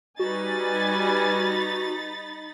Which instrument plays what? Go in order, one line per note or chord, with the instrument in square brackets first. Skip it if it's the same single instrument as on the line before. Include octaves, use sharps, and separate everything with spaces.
[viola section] G3 B4 G#5 [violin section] D#4 B5 A6 [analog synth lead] F#4